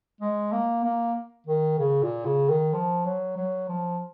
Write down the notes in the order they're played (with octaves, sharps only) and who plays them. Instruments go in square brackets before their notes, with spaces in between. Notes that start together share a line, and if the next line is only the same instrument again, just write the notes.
[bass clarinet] G#3
A#3
A#3
D#3
C#3
A#2
C#3
D#3
F3
F#3
F#3
F3